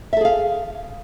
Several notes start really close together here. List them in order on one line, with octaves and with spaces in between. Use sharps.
E5 A4 G#4 F5